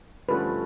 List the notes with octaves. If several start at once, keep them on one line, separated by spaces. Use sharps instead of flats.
G2 D3 F3 A3 C#4 B4